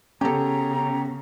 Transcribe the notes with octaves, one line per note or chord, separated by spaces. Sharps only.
C#3 B3 C#4 G4 A4 A#5